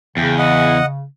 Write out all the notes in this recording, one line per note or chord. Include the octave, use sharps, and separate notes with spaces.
E2 C#3 G5
D#5 F#5